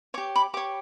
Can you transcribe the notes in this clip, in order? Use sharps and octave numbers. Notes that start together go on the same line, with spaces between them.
G4 C#5 D6
B5 D6
G4 C#5 D6